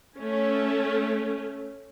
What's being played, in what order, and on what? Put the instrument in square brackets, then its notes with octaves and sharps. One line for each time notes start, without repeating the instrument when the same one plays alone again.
[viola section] A3 C#4